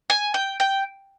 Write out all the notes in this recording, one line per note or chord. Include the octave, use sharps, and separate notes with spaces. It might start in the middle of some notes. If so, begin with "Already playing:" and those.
G#5
G5
G5